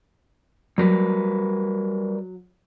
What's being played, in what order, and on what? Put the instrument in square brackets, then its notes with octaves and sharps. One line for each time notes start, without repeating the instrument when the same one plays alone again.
[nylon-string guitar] F#3 [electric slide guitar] G3 A#4 B4